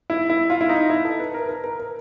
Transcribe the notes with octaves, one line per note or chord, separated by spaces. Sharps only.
E4
E4
F4
E4
D#4
E4
A4
B4
A#4
A#4
A#4
A#4